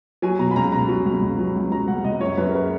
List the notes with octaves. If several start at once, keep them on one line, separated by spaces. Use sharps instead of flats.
F#3 G#5
B2 A#5
B5
C#2 A#5
B2 A#5
F#3
C#2
C#2
F#3
C#2
F#3 A#5
C#2 F#5
C#2 D#5
F#2 C#5
F#2 B4
A#4
G#3 B4